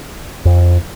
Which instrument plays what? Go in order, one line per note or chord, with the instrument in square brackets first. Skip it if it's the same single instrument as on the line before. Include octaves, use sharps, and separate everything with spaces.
[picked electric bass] F2